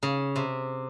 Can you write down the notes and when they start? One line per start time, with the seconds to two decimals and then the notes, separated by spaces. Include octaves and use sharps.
0.03 C#3
0.36 C3